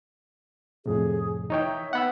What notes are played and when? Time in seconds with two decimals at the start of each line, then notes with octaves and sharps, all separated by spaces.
0.86 F2 A2 C3 G#4
1.50 E3 D#4 C#5 G5
1.64 E5
1.93 B3 F#5 B5 E6